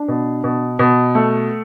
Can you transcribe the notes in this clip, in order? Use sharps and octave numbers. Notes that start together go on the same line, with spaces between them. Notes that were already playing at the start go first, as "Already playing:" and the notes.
Already playing: D4
B2
B2
B2
A3